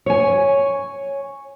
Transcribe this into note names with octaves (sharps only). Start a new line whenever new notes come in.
C#5 G#5